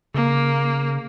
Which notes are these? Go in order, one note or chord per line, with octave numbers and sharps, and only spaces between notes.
C#3 A#3